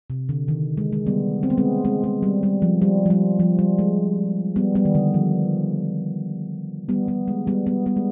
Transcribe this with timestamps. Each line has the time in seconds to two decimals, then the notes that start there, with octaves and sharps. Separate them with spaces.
0.10 C3
0.29 D3
0.48 D#3
0.77 G#3
0.93 G#3
1.07 G3 B3
1.43 C4
1.50 B3
1.58 G#3 C4
1.85 G#3 C4
2.04 G#3
2.23 G3
2.43 G3
2.62 F3
2.82 G3
3.06 F3
3.10 G3
3.39 F3
3.59 G3
3.79 G#3
4.56 G3 B3
4.75 G3 B3
4.85 D#3
4.95 D3
5.14 F3
6.89 G3 B3
7.08 G3 B3
7.28 G#3
7.47 G3 B3
7.66 G3 B3
7.86 G3 B3
7.97 G#3